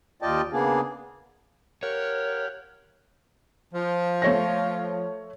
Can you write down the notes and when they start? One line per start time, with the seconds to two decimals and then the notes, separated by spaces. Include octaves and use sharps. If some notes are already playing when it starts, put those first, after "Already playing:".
0.22 D#2 F4 D5 D#5 G5 A5
0.52 C#3 A#3 B3 D4 G#4
1.83 G4 A#4 C#5 F5 F#5
3.74 F3
4.22 A3 C#5 A#6